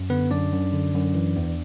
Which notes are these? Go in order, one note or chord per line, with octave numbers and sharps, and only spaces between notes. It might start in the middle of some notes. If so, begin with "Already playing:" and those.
Already playing: F#2
D3 B3 B4
F#2 D4 D5
F#2
D3
F#2
E3
E2